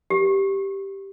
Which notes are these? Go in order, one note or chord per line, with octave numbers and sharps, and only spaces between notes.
G4